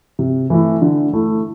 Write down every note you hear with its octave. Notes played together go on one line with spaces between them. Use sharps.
C3
E3 A3 E4
D3
A3 E4